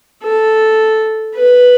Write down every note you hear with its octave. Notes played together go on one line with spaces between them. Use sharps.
A4
B4